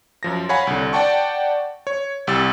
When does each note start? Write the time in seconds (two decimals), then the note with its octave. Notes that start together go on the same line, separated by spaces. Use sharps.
0.23 F#2 F3 A#6
0.49 C#5 F5 F#5 G#5 B5
0.67 C2 D3
0.93 D5 F#5 G5 A5 C#6
1.87 C#5
2.27 C2 G4 E6 A6